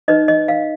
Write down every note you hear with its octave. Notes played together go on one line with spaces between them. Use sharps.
D#4 B4 D#5
D#5
F5